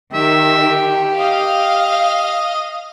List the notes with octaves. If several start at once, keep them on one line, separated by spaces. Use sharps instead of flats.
D#3 G4 E5
D#5 F5